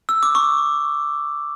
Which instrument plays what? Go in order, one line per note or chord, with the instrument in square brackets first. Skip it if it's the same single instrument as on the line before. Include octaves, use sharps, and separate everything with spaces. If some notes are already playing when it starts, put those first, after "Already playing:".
[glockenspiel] E6
D6
C#6